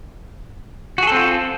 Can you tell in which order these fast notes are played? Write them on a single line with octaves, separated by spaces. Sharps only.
F#4 G#4 A4 C4 F4